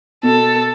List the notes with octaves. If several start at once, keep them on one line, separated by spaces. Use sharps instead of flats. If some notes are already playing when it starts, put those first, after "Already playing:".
B2 A4